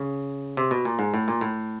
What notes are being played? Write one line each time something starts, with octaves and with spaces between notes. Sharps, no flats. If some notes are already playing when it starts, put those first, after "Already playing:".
Already playing: C#3
C3
B2
A#2
G#2
A2
A#2
A2